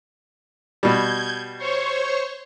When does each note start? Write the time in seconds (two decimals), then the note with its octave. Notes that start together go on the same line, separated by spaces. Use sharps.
0.83 B2 G3 G6 G#6
1.57 C5 C#5 C#6